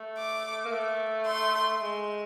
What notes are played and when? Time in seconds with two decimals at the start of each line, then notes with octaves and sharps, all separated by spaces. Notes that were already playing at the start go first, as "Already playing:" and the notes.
Already playing: A3
0.18 D6
0.65 A#3
0.73 A3
1.26 C6
1.81 G#3